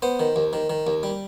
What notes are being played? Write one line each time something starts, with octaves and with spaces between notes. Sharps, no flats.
B3 C5
D#3
D#2
D#3
D#3
D#2
G3